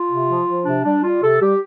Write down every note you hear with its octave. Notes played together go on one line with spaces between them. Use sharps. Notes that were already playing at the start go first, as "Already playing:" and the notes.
Already playing: F4
C3
F3
F3
C3 D4
G3 D4
G3 F4
C3 A4
G3 G4